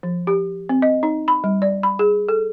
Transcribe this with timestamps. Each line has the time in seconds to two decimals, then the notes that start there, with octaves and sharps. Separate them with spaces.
0.03 F3
0.27 G4
0.69 C4
0.82 D#5
1.03 D#4
1.28 B5
1.44 G3
1.62 D5
1.83 B5
1.99 G#4
2.29 A4